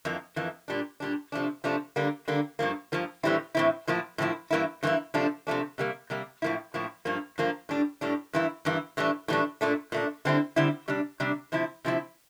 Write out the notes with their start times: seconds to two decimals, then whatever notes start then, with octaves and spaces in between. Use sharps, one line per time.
0.05 F2 E3 A#3
0.36 F2 E3 A#3
0.68 A#2 G3 D4
1.00 A#2 G3 D4
1.32 C3 F3 A3 D4
1.64 C3 F3 A3 D4
1.96 D3 G3 A#3
2.28 D3 G3 A#3
2.59 G2 F3 A#3
2.92 G2 F3 A#3
3.23 A2 E3 G3 C4 E4
3.55 A2 E3 G3 C4 E4
3.87 A2 F3 A#3 E4
4.18 A2 F3 A#3 E4
4.51 G2 E3 A#3 E4
4.83 G2 E3 A#3 E4
5.14 C3 F3 A3 D4
5.47 C3 F3 A3 D4
5.78 C3 G3 A#3
6.10 C3 G3 A#3
6.42 A2 F3 A#3 E4
6.74 A2 F3 A#3 E4
7.05 G2 F3 A#3
7.38 G2 F3 A#3
7.69 A2 G3 D4
8.01 A2 G3 D4
8.33 G2 E3 A#3 E4
8.65 G2 E3 A#3 E4
8.97 A2 E3 G3 D4
9.28 A2 E3 G3 D4
9.61 A#2 A3 D4
9.92 A#2 A3 D4
10.25 D3 G3 C4 E4
10.56 D3 G3 C4 E4
10.88 C3 G3 D4
11.20 C3 G3 D4
11.52 C3 F3 C4 E4
11.85 C3 F3 C4 E4